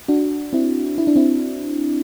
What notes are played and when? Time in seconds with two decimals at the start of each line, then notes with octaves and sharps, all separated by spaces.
0.08 D4 F#4
0.53 C4 E4
0.98 E4
1.07 D4
1.16 C4 E4